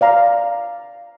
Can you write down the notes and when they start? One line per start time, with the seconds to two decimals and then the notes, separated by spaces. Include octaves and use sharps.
0.01 D5 F5 A#5